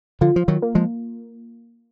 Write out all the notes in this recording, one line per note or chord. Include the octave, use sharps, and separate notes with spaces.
D3 F3 F4
F3
D#3 F#3
A#3
F3 G#3